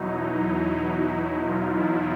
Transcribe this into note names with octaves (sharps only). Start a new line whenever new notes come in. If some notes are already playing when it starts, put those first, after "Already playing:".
Already playing: E2 B2 F#3 D#4 E4
E4
F4
E4